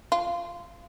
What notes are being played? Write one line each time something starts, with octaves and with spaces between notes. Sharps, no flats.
F4